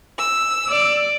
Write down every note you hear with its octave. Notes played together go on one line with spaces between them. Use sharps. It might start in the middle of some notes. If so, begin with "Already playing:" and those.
E6
D5